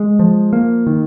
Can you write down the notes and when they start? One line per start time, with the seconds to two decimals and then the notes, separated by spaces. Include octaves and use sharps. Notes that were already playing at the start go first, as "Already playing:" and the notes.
Already playing: G#3
0.19 F3
0.53 A#3
0.87 D#3